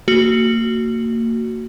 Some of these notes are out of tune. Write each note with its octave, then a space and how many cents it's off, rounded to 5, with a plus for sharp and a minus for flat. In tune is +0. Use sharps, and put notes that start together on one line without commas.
A#3 -30 F#4 +0